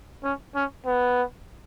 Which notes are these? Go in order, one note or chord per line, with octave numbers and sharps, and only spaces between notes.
C#4
C#4
B3